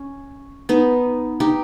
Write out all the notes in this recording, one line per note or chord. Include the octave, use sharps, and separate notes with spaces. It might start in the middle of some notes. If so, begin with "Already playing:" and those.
Already playing: C#4
B3 D#4
D#4 G4